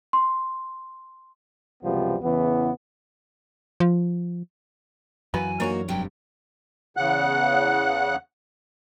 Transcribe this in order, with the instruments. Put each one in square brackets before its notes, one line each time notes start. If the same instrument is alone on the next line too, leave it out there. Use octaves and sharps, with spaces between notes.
[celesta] C6
[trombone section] C#2 F#2 C3 F3 G3 B3
E2 C#3 E3 B3
[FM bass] F3
[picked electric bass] F#2 E3 F#3 [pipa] A#3 B3 B4 [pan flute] G#5
[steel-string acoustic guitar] A#3 D#4 F#4 [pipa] D4 A#4 C#5
[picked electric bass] F1 G2 C3 [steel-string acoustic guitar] F#3 [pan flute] G5
[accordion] E2 C#3 F#5 F#6